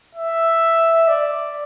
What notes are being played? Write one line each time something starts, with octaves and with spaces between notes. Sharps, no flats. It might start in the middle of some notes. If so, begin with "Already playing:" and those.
E5
D5